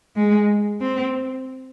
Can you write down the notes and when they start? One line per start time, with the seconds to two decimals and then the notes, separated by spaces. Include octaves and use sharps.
0.16 G#3
0.81 C4